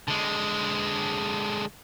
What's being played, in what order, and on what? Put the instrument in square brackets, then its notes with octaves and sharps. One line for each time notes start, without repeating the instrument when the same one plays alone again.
[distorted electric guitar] D3 G#3